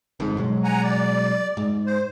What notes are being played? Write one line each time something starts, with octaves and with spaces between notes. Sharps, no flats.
G1 F2 G#2
B2 F#3 G#3
F#5 G#5 A#5
D5
G#2
C5